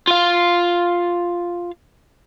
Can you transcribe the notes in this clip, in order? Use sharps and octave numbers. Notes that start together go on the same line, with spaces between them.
F4 F5